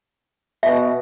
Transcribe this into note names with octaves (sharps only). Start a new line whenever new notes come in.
B2 E5